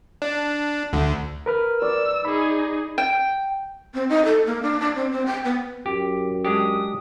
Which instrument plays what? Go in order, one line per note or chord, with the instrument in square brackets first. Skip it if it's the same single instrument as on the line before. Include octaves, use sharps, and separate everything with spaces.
[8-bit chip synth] D4
D2 D3
[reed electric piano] A#4 B4 F6
[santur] D5 [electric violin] E6
[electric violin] D#4 G#4 [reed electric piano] B5
[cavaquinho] G5
[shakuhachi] C4
D#4
A4
A#3
D4
D4
C4
C4
G5
B3
[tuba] F#2 [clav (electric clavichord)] G4
[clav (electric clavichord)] G#3 D4 G4 [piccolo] D#6